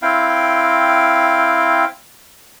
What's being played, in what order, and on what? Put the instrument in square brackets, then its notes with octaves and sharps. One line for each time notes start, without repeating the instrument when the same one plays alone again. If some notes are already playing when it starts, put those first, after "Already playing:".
[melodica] C4 E4 F5 G5